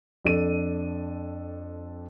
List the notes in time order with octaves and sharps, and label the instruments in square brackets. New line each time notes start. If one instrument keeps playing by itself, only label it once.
[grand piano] F2 D4 A4 D#7